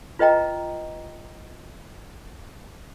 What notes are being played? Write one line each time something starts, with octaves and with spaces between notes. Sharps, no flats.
F4 B4 D#5 G5 A#5